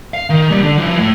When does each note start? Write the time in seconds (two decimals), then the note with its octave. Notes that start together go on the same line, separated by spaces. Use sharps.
0.14 F5
0.30 D#3
0.50 A#2 G3
0.63 D3
0.78 F3 E4
0.99 A2